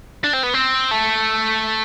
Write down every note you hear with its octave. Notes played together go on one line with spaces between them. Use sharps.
D4
C4
B3
C4
A3